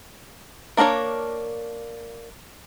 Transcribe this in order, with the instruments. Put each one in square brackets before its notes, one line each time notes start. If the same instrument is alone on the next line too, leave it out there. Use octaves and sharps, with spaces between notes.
[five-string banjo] A#3 D4 A#4 C5 C#5